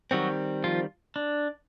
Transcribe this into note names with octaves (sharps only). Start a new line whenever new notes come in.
D#3 F#3 G3 C4 F#4
F3 F4
D4